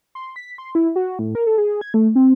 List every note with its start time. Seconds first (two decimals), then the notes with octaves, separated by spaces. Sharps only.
0.15 C6
0.36 B6
0.58 C6
0.75 E4
0.96 F#4
1.19 A2
1.35 A#4
1.46 A4
1.58 G#4
1.81 G#6
1.94 A3
2.15 C4